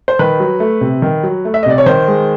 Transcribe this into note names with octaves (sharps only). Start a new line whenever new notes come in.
C5
D#3 B4
F#3
A3
C3
D#3
F#3
A3
E5
D#5
C3 D5
C#5
D#3 C5
G#3